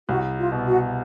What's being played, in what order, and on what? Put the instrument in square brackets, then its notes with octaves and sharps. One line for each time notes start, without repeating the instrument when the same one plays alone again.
[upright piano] C2 [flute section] F#4
[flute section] F4
[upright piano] B2
[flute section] F#4